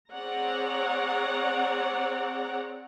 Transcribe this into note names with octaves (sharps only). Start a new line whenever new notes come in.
C4 G#4 C#5 D5 F#5 A#5